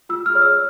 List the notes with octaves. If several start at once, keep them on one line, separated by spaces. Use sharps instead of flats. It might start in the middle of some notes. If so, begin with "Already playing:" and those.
F4 E6
F6
G#4 C#5
E6